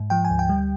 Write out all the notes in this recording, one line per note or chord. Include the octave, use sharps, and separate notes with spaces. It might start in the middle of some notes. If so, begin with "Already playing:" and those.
Already playing: G#2
F3 G5
G#5
D2
G5
G3